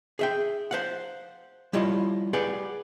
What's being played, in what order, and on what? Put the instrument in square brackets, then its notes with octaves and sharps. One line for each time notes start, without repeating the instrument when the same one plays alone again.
[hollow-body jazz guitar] G#4 E5 G5
C5 F5 F#5
G3 E4 F4 C#5 D#5
G4 G#4 B4 D5 F#5